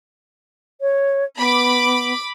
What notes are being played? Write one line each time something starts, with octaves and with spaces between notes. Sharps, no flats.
C#5
B3 B5 D6